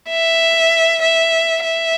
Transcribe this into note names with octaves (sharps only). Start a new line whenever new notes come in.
E5
E5
E5